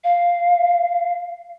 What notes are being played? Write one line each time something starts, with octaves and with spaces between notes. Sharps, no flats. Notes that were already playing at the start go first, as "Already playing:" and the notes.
F5